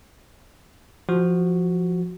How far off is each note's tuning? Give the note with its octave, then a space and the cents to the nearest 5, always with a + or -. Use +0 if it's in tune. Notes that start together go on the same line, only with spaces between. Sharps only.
F3 +0 F#4 +0